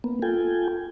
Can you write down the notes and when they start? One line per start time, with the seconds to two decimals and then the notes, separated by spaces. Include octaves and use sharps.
0.04 A#3 B3
0.22 F4 A4 G5 G#5